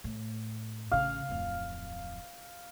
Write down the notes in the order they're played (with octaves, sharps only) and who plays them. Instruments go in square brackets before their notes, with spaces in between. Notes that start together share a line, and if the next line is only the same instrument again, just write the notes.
[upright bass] A2
[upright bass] A1 C#3 [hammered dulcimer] F5
[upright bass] D1 F2